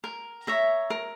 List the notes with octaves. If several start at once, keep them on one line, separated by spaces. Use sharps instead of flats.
A#4
C#5 E5 A#5
A#4